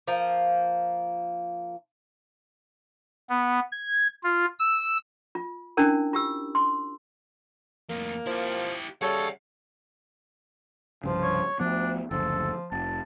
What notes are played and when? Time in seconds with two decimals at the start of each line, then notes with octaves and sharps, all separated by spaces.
0.08 F3 A#3
3.29 B3
3.72 G#6
4.24 F4
4.59 E6
5.35 F4
5.77 C#4 D4 E4 A#4
6.13 F4 G4 E6
6.55 C6
7.90 F2 A2 A#3
8.27 F3 E4 G4
9.02 C#3 G3 A4 C#5 E5 F#5
11.04 C2 G2 C#3 F3
11.22 C#5
11.60 D2 F3 B3 D4
12.11 F#1 D2 F3 A4
12.72 F1 A5